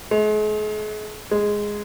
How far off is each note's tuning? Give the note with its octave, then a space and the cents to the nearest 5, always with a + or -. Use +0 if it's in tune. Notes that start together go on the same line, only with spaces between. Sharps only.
G#3 +40
G#3 -5